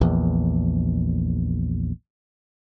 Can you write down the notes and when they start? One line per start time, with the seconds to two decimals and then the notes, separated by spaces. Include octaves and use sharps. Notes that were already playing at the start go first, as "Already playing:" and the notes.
0.01 A#1 E2